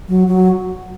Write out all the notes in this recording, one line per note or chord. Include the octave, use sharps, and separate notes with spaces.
F#3
F#3